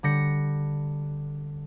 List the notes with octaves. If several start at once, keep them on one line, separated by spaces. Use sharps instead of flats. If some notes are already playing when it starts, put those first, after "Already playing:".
D3 G3 A#6 C#7